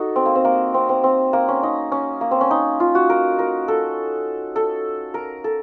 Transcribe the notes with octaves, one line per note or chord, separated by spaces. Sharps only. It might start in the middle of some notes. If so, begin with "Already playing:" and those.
Already playing: D#4 F#4 A4
C4
A#3
C4
A#3
C4
C4
C4
A#3
C#4
D#4
C#4
A#3
C4
C#4
D#4
F4
F#4
A#4
A#4
A4
A4
A#4
A4